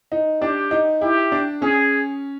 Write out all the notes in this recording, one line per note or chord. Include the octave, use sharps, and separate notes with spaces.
D#4
D4 G4
D#4
E4 G4
D4
C#4 G#4